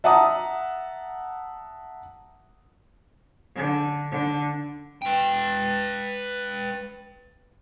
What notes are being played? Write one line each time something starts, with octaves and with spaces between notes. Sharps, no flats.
E5 F#5 A5 A#5 D#6
D3
D3
B4 G5